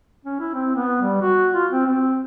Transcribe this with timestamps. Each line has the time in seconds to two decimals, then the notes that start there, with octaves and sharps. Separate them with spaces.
0.25 C#4
0.40 E4
0.54 C4
0.75 B3
1.01 G3
1.22 F#4
1.54 F4
1.71 C4
1.86 C4